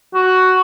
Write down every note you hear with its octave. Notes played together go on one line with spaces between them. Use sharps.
F#4